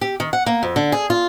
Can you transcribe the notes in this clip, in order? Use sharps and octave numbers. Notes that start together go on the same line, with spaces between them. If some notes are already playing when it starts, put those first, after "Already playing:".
G4
D#3
F#5
A#3
F2
D3
G#4
F4